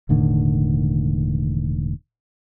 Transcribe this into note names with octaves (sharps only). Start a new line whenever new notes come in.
E1 A2 D3 D#3